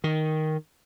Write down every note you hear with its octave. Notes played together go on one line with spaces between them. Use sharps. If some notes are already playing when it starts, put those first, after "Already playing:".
D#3